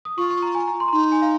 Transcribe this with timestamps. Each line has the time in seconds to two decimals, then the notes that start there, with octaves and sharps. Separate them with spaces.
0.05 D#6
0.17 F4 C#6
0.31 C#6
0.42 A#5
0.55 G#5
0.68 A#5
0.80 C6
0.88 A#5
0.92 D#4 C6
1.02 A#5
1.12 G#5
1.22 F5